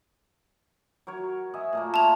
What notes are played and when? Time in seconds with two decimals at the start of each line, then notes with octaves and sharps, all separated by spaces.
1.07 F#3 A#4 C#5
1.54 D#5 E5 G#5
1.73 A#2 A3 A#3
1.94 F4 G#5 A5 F7